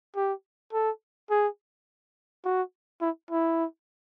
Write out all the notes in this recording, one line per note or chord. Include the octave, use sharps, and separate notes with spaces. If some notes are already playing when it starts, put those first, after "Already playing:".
G4
A4
G#4
F#4
E4
E4